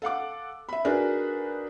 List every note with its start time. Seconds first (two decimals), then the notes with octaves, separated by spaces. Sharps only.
0.02 A4 F5 F#5 D6
0.69 E5 B5
0.85 D4 D#4 F#4 G#4 A#4 B4